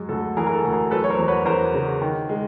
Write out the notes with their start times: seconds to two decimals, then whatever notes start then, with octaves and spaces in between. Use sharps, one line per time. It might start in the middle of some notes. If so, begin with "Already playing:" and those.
Already playing: F#2 G#3
0.09 D2 A4
0.37 E3 G#4 A#4
0.47 A#4
0.55 A4
0.64 D2
0.72 G#4 A#4
0.91 F#3 A4 B4
1.04 C#5
1.10 A#4 C5
1.19 E2
1.28 B4 C#5
1.46 E2 A#4 C5
1.74 C#3
2.01 D#3
2.29 G#3